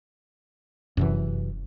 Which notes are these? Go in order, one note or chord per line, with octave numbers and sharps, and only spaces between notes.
F1 F#2 C3 E3